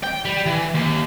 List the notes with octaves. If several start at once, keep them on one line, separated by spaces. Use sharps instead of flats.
G5
G3
E3
D#2